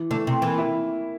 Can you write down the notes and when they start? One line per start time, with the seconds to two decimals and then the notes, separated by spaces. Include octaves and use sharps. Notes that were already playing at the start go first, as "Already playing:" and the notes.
Already playing: E3
0.11 D3 A3
0.27 C3
0.42 E3 A#3
0.58 E4